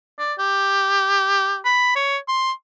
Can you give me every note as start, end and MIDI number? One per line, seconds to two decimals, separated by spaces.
0.19 0.34 74
0.39 1.59 67
1.65 1.92 83
1.96 2.17 73
2.28 2.52 84